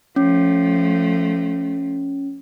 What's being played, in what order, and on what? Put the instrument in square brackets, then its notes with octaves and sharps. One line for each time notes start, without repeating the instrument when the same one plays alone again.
[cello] F3 A3 [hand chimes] C#4